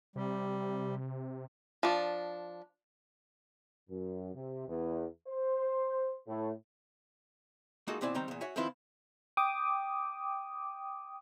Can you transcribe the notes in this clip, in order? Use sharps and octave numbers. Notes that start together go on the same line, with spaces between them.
C3 G3
F3 D4
F#2
C3
E2
C5
A2
G#3 A#3 D#4 F4 F#4 A4
D#2 B2 C4 E4 D5 G#5
D#3 G3 C4 G5 A#5
E2 A#2
F#4 C#5 E5 G#5
D#3 F3 C4 E4 F4 B4
G5 D6 D#6